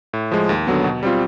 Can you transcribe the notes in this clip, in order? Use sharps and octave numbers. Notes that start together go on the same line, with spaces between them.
A2
F3 G#3
D#2
D3 F#3 B3
B2
G3 C4 F4